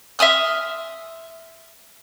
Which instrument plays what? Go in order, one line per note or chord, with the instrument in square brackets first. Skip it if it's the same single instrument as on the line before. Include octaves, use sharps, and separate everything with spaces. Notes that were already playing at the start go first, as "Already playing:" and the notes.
[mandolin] E5 C6 D#6 F6